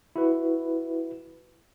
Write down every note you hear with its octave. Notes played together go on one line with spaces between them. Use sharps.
E4 F#4 B4